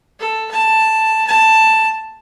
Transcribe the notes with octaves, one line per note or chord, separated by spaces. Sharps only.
A4
A5
A5